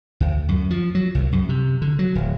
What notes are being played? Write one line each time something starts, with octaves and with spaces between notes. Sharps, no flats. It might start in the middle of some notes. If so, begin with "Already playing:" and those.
D2
F#2
F3
F#3
C2
F#2
C3
D3
F#3
D1